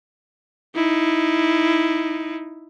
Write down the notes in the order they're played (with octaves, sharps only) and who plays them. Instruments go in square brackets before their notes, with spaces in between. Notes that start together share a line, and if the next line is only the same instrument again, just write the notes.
[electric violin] D#4 E4